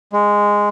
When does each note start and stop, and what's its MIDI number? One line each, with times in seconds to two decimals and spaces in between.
0.13 0.69 56